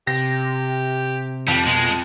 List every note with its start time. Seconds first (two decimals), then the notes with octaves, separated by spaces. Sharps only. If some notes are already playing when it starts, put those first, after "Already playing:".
0.07 C3 G4 A#6
1.48 F2 G3
1.67 B2 G#3